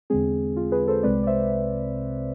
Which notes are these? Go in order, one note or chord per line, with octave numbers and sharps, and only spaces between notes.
E2 D3 G#3 C4 G#4
F4
G#4 B4
A4 C5
C2 C3 G#3 C4 B4 D5
D5
C5 E5